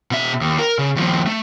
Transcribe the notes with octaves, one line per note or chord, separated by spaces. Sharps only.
B2 E5
D#2
A#4
C#3
D#2 F3
A3